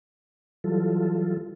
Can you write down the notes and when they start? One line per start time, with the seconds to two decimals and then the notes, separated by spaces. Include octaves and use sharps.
0.64 E3 F#3 G3 F4 A4